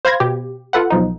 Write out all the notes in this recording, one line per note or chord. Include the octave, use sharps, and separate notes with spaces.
C5 F5 B5 G#6 A#6
B2 G4
F4 A4 B4 F#5
B1 F3 D#4